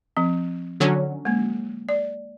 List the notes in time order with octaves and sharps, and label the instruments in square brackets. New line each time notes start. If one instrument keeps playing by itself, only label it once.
[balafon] F3 C4
[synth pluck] D3 F#3 C#4
[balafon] G#3 A#3
D5